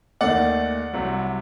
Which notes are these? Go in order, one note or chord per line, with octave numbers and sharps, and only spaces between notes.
D#2 D#3 A3 D5 F#5
C2 C3 F#3